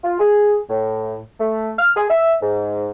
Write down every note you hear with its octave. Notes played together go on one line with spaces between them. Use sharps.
F4
G#4
A2
A3
F6
G#4
E5
G#2